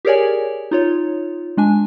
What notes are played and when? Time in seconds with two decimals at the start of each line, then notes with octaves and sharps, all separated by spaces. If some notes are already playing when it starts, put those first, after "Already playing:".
0.05 G4 G#4 A#4 C#5 D5 G#5
0.71 D#4 F4 C#5
1.57 G#3 D4 G#5